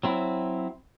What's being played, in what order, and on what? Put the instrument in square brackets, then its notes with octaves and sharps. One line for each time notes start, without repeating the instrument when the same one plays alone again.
[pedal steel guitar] F#3 C4 E4